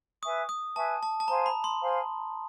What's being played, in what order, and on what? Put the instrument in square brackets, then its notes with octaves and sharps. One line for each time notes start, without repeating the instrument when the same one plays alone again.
[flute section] B4 E5 G#5 C#6 [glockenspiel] D#6
[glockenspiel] D#6
[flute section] B4 E5 G#5 C#6 [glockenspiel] A5
[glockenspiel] A5
A5
[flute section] C5 F5 G#5 C6 [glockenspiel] A#5
[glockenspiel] B5
C6
[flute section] C5 F5 G#5 C6